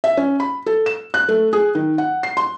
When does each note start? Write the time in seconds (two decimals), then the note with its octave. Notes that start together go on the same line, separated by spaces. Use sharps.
0.04 E5
0.17 C#4
0.40 B5
0.66 A4
0.86 E7
1.14 F#6
1.29 A3
1.53 G#4
1.75 D#3
1.98 F#5
2.23 C7
2.37 C6